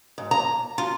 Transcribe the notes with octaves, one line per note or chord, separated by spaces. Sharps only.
G#2
A#5
F4